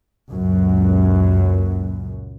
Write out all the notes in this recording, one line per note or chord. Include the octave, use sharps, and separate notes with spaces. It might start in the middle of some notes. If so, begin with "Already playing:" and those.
C#2 F#2 A#2